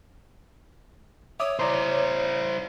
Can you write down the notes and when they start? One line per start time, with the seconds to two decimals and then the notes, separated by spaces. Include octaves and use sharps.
1.40 C#5 E5 D6 D#6
1.59 E4 C5 D5 A#5 C6